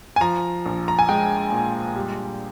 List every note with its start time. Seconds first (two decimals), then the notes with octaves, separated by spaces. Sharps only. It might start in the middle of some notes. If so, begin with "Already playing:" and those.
0.16 G#5
0.21 F3 A#5
0.66 A#1
0.88 A#5
0.99 G#5
1.09 G#3 G5
1.52 A#2
1.96 G3